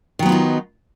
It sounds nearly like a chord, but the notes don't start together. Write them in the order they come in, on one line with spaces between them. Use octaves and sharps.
D#3 F#3 B3 F4 D#4